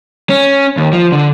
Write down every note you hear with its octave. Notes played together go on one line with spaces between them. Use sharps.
C#4
D#2
F3
D3